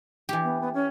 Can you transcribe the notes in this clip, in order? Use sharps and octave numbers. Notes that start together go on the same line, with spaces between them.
E3 G4
B3
B3
C#4